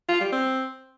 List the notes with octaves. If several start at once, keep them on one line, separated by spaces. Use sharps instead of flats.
F4
G3
C4